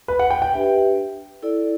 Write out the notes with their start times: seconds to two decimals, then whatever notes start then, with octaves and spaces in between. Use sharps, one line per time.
0.08 B4
0.19 F#5
0.30 G5
0.42 G5
0.53 D4 G4 B4 E5
1.43 E4 A4 D5